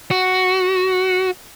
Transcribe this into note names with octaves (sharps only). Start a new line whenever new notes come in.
F#4